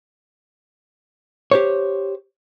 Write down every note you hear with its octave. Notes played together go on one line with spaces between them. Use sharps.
G4 C5 C#5